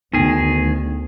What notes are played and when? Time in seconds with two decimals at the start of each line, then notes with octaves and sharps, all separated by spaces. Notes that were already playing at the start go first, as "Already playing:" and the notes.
0.13 D2 D#3 B3 G#4